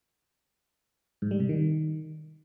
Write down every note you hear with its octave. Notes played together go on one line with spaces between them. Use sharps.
G#2
G3
C3
D#3